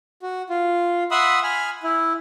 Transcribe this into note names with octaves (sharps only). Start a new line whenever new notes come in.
F#4
F4
E5 F#5 B5 C6 D#6 E6
G#5 B5 F6
E4